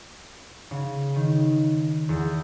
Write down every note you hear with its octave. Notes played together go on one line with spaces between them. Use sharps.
C#3
D#3
E2